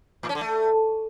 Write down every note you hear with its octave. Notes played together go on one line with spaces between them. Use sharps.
A2
C#4
D3
A3